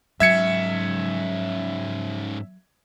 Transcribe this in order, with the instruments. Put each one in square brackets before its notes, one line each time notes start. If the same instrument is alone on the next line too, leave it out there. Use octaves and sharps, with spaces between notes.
[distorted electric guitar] G#2 C#4 [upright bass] F#3 [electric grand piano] E5 G#6 C#7